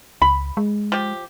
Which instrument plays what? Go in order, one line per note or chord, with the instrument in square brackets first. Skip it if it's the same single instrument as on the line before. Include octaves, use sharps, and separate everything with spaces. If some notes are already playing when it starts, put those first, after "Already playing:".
[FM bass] C#2 [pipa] B5
[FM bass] G#3
[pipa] F3 G4